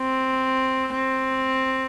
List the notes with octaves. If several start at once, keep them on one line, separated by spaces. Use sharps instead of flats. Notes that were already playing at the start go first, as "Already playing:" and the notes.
Already playing: C4
C4